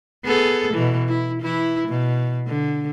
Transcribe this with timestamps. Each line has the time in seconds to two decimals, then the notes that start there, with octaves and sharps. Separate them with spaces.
0.25 B3 G#4 A4
0.74 B2 E3
1.08 E4
1.41 E3 E4
1.88 B2
2.47 D3